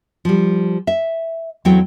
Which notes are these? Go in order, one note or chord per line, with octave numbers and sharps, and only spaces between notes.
F3 G3
E5
E2 F#3 A3 C4 E4 G5